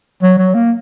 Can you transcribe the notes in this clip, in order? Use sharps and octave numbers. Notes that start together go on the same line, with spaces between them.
F#3
F#3
A#3